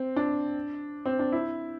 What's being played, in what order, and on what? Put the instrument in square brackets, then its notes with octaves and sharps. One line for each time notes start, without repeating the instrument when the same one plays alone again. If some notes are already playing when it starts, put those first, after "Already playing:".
Already playing: [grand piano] C4
D4
C4
D4
E4